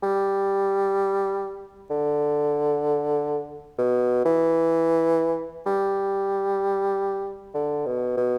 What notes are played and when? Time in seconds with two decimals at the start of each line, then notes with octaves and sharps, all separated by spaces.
0.03 G3
1.90 D3
3.79 B2
4.25 E3
5.66 G3
7.54 D3
7.86 B2
8.17 B2